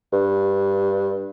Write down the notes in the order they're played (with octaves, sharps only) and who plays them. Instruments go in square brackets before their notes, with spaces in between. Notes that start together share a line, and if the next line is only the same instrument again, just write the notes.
[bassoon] G2